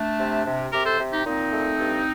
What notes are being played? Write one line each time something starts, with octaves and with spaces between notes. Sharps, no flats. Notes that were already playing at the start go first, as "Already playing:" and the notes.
Already playing: A3 D4
C3
C3
C3 G4 A#4
A4 C5
C3
D#4 G4
A#2 C4 D#4
A3
G2